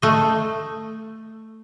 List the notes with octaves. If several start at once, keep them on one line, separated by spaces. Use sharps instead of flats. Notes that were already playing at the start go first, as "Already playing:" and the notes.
A3 D#5